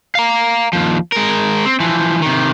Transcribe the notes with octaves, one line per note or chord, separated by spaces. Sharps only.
F5 A#5
D#2 F3
G#3 A#4
C4
E3 F3
C3 D#3